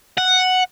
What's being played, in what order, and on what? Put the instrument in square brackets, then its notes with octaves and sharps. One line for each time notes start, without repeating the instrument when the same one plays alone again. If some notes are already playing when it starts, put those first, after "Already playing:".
[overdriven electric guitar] F#5